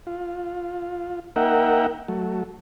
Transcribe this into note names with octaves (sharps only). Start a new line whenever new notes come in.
F4
A#3 D#4 A#4 E5 F#5 G5
F#3 A3